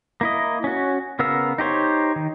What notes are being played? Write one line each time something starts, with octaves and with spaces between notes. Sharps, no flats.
A#3 E4 D#5
C#4 F#4
C#3 B3 A#4 F5 E6
D#4 G4 C5 C#5
D#3